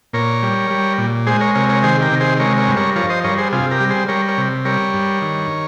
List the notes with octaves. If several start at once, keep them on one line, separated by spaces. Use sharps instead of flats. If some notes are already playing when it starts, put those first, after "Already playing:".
A#2 A#4 C#5
G3
G3
A#2
G#3 G#4 C5
A#4 C#5
C3 A#4 C#5
A#4 C#5
D#3 G#4 C5
G4 A#4
C3
G#4 C5
G#3 A#4 C#5
A#4 C#5
G2
A#4 C#5
F3 A#4 C#5
C5 D#5
G2 A#4 C#5
G#4 C5
C3 F4 G#4
G4 A#4
G3
G#4 C5
G3 A#4 C#5
A#4 C#5
C3
G3 A#4 C#5
G2
D#3